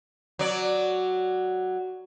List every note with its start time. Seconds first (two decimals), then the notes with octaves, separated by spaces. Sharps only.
0.39 F#3 D5